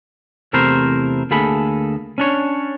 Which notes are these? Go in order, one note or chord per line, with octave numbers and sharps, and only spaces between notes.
E2 C3 A3 E4 A#4 C5
D2 A#3 G#4 A4 B5
C#4 D4 C#5